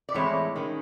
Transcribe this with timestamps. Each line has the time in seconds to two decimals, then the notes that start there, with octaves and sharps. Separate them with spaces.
0.09 D5
0.14 A2 E3 G#3 C4 E4 C#5
0.56 D#3 G#3 C#4